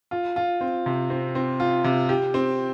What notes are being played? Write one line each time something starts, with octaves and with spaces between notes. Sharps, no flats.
F4
F4
C4
C3
C4
C4
F4
C3
G4
C4